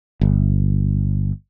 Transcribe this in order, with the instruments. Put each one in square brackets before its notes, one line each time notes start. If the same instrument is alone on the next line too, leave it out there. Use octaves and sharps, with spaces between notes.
[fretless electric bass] G1